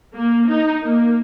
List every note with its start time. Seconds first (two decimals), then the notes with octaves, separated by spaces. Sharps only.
0.16 A#3
0.49 D#4
0.84 A#3